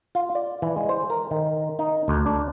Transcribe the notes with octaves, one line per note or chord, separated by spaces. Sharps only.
F4
D5
E3
G#3
C5
A#4
D#3
D#4
D2
D4